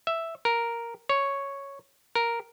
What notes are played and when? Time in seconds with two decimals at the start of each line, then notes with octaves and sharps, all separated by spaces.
0.07 E5
0.45 A#4
1.09 C#5
2.15 A#4